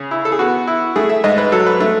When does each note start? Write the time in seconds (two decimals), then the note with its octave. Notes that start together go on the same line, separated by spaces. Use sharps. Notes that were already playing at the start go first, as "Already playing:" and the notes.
Already playing: C#3 G#4
0.11 E4
0.25 A4
0.32 G#4
0.39 B3 F#4
0.67 E4
0.96 A3 G#4
1.09 E5
1.24 G#2 D#5
1.38 B4
1.52 F#3 A4
1.66 B4
1.80 A3